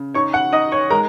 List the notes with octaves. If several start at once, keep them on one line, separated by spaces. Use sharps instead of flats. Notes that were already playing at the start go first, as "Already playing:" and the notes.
Already playing: C#3
D#4 C#5 C#6
F#5 F#6
D#4 D#5 D#6
C#5 C#6
G#3 A#4 A#5